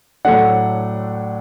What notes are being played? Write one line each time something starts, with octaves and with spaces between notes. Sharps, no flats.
A2 F#3 A3 D4 F#5